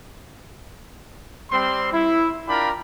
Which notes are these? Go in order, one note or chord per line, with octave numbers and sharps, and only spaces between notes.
G3 C4 C6
E4
D4 F4 A#4 D5 G5 B5